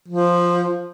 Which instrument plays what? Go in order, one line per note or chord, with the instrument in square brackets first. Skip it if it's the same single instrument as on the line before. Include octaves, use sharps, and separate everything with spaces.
[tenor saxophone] F3